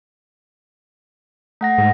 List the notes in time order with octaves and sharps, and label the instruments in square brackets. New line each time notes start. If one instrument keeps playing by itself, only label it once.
[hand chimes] A3 F#5 A#6
[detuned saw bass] G#2